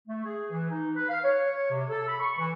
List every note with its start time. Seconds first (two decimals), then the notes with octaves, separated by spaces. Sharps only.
0.07 A3
0.24 G#4
0.51 E3
0.70 D#4
0.95 B4
1.09 F5
1.24 C#5
1.71 C3
1.90 A4
2.07 B5
2.20 C#6
2.38 E3